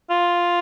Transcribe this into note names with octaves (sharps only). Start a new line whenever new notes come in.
F4